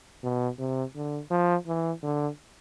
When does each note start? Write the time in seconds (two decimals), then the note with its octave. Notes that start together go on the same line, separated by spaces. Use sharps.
0.23 B2
0.59 C3
0.95 D3
1.30 F3
1.67 E3
2.03 D3